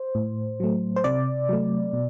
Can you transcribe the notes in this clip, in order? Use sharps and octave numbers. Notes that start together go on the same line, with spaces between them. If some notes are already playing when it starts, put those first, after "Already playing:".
Already playing: C5
A2
F#3 A3
C5
C3 D5
F#3 A3
B2